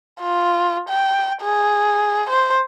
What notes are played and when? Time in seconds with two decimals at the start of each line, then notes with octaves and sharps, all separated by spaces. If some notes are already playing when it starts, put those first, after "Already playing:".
0.21 F4
0.89 G5
1.42 G#4
2.30 C5